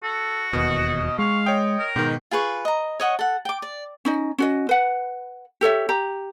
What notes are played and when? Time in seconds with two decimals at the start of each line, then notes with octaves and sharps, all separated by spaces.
0.03 F#4 A4
0.53 E1 D#2 B2 D#5
1.19 G#3 F5 C#6
1.46 C#5 D#5 G5
1.79 A#4
1.96 G#2 B2 D#3 G5
2.31 F4 G#4 B4 C#6
2.65 D#5 A#5
3.00 C#5 D#5 F#5 C#6
3.19 A4 F#5
3.45 G5 D6
3.62 D5
4.05 C#4 D#4 D#5
4.38 C#4 F#4 D#5
4.69 B4 F#5
5.61 G4 A4 C#5 E5
5.89 G4 A#5